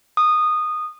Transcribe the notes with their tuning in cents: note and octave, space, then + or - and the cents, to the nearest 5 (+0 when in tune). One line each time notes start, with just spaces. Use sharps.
D#6 -15